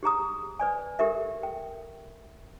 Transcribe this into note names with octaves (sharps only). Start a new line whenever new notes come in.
G4 G#4 A#5 D#6
B4 D5 G#5
G4 A4 A#4 E5
G5